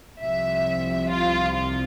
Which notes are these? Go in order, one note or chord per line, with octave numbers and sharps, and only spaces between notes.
C2 C3 F3 E5
F4
F4